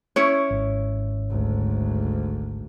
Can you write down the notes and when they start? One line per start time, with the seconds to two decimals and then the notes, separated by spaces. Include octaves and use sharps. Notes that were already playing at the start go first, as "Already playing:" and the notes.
0.16 C#4 E4 C#5
0.51 G#1
1.31 D2 G#2